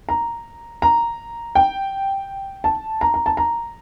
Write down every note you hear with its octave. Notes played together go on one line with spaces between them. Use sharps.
A#5
A#5
G5
A5
A#5
A#5
A5
A#5